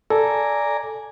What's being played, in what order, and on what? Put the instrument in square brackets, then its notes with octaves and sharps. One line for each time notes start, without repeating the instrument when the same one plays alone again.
[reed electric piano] A4 [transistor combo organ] D5 G#5 A#5